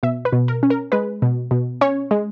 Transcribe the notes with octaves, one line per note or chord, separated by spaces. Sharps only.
B2 E5
B4
B2
A#4
C#4
A#4
G#3 B4
B2
B2
C#4 C#5
G#3